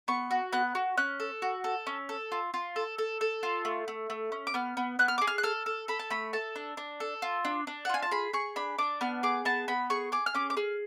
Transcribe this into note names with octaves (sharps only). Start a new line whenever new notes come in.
B3 C#6
F#4
B3 F#6
F#4
C#4 F#6
A4
F#4
A4
C#4
A4
F4
F4
A4
A4
A4
F4
A3
A3
A3
C#4
D6
B3 F6
B3
B3 F#6
F6
G#4 D6
F6
F#6
A4 F6
A4
A4 B5
A5
A3 B5
A4 A5
D4
D4
A4
F4
D4
D4
F#5
F4 G#5
A5
G#4 B5
G#4 C#6
D4 B5
D4 D6
B3 F6
G#4 D6
B3 A5
B3 B5
G#4 C#6
G#4 D6
F6
C#4 D6
D6
G#4 F6